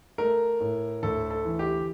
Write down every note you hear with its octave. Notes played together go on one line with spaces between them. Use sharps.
A3 A#4
A2
D2 A4
A4
E3
G4